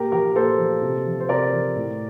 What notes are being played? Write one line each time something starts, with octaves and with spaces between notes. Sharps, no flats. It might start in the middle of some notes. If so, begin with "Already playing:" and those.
Already playing: A#2 G4 A#4
F3 G4 A#4
A#2 A4 C5
F3
C3
F3
C5
C3 A#4 D5
F3
A2